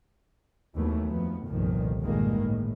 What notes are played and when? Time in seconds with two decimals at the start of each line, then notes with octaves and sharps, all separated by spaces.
0.75 D#2 E3 F#3 A3 B3
1.07 F2 F3 B3
1.48 G1 C2 A#2 D#3 F3
2.01 G1 G2 A#2 D#3 G#3 A#3
2.41 A2